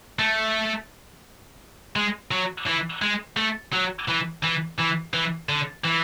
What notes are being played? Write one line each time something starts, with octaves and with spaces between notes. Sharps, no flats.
A3
G#3
F#3
E3
G#3
A3
F#3
E3
E3
E3
E3
D3
E3